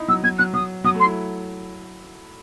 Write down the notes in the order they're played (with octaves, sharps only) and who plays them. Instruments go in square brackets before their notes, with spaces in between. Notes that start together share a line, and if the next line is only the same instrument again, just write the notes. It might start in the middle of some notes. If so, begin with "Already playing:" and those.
Already playing: [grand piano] D#4 E4
[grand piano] F#3 [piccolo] E6
[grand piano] F#3 [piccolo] G#6
[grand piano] F#3 [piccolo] F#6
[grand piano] F#3 [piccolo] D#6
[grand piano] F#3 [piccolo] D#6
[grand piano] A3
[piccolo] C6
[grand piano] E4